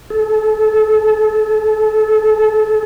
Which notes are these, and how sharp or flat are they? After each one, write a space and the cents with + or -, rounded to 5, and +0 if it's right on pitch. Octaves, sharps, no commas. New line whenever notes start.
A4 -30